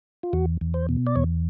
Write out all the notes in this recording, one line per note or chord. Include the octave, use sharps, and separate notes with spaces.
F4
E2 F#4
E2
C5
B2
D5
E2 C#5